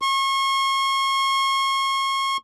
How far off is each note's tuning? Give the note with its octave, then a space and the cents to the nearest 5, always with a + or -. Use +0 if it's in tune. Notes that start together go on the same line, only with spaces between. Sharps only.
C#6 -35